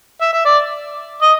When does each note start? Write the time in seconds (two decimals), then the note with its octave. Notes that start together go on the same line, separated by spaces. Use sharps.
0.21 E5
0.33 E5
0.45 D5
1.22 D#5